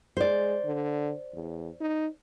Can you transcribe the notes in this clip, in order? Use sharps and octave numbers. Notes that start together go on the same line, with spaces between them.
G#3 C5 D5
D3
E2
D#4